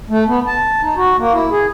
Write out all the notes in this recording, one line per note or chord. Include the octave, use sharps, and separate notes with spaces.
A3
B3
A5
D#4
F#4
A#3
E4
G#4